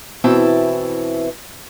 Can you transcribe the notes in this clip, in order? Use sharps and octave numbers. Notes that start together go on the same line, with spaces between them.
B2 E3 C4 E4 G5 A5